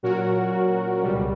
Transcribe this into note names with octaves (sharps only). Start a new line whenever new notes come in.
A#2 F#3 C#4 F#4 A#4
C#2 B2 G3